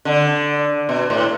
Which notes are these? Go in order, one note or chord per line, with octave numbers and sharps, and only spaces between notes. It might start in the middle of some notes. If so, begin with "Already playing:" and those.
D3
B2
A2